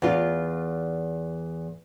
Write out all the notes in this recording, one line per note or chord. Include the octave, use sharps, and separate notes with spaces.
E2 F4